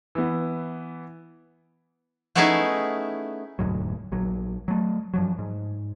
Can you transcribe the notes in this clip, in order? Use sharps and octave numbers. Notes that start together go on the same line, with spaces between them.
E3 B3
A3 B3 C#4 D#4 E4 G#4
E1 D2 G#2 F#3
A#1 F#3
F#3 A3
G2 F3 F#3
G#2